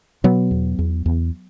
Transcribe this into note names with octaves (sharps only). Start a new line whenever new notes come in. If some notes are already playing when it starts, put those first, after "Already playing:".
B2 F#3 B3
E2
E2
E2